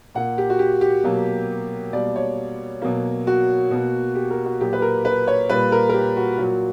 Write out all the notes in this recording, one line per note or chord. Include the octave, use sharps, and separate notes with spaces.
A#2 A#3 F#5
G4
F#4
G4
G4
B2 F#3 A#3
B2 G3 A#3 D5
C#5
B2 F#3 A#3
F#4
B2 A#3
G4
A#4
F#4
A#2 F#3 A#3 G4
B4
A#4
B4
C#5
A#2 G3 A#3 B4
A#4
A#4
G4
F#4
A#2 F#3 A#3 F#4